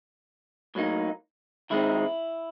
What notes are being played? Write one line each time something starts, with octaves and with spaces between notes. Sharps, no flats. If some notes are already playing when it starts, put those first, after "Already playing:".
A2 F#3 A#3 D#4
D#3 G#3 C4 D#4 E4